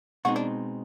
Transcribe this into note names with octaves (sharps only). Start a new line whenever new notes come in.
B2 G#3 C4 D#4 F#4
D4